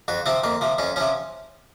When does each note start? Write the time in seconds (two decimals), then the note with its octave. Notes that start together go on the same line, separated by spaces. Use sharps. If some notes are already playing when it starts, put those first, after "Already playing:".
0.08 F2 F#4
0.26 C3 F3 C4
0.44 F2 A#3
0.61 C3 F3
0.79 F2 C#4
0.96 C3 F3 C#4